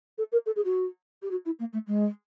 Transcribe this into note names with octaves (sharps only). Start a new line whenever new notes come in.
A4
A#4
A4
G#4
F#4
G4
F#4
E4
A#3
A3
G#3